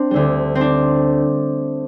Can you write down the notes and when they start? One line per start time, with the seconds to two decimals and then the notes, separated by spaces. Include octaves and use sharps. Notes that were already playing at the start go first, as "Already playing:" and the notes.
Already playing: C4 D4
0.11 D2 D3 G3
0.55 C4
0.61 D4